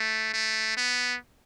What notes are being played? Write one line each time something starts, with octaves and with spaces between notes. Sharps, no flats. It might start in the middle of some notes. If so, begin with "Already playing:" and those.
Already playing: A3
A3
B3